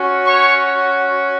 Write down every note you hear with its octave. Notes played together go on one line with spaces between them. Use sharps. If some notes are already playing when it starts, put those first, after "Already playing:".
Already playing: C#4 F#4
C#5 C#6